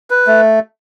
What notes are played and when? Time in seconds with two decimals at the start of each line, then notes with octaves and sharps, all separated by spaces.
0.10 B4
0.27 A3